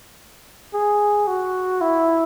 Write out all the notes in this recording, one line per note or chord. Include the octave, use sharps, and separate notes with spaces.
G#4
F#4
E4